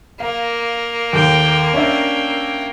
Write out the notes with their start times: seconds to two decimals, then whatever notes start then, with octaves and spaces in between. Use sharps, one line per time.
0.20 A#3 F5
1.13 D#2 A3 G5
1.74 C#4 D4 E5 G5